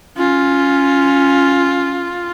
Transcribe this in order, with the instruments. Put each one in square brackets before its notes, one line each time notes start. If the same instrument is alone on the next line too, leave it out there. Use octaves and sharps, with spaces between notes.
[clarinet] C#4 [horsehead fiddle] F4